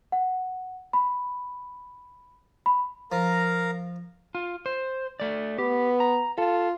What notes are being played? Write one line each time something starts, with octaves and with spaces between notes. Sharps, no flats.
F#5
B5
B5
F3 A#4 F5 A#5
F4
C5
A3 D5
B3 G4
A#5
F4 A4